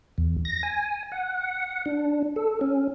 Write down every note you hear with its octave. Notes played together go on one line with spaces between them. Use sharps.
E2
A#6
G#5
F#5
D4
A4
C#4